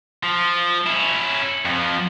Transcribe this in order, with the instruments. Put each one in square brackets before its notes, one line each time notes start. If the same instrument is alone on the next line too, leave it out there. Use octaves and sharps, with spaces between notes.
[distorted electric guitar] F3
C#4 E4
F2 F3